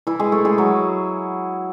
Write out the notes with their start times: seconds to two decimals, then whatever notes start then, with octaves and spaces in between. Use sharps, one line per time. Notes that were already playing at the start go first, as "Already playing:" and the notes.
0.07 E3 E4
0.19 G#3 G#4
0.32 A3 A4
0.45 G#3 G#4
0.58 F#3 F#4